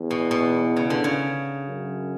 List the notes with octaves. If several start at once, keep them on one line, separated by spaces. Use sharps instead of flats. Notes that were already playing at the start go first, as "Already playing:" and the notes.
Already playing: E2
B2
B2
C#3
D3
C#3
F#2